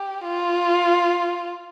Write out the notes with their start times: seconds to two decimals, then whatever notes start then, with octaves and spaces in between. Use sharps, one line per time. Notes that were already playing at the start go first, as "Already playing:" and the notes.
Already playing: G4
0.25 F4